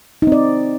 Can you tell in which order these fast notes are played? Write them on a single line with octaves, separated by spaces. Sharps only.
D#4 C4 D5